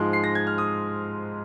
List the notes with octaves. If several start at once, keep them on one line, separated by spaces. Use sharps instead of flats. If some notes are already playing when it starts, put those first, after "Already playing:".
Already playing: G#2 F3 G#3 C6
C7
A#6
G#6
F6
D#6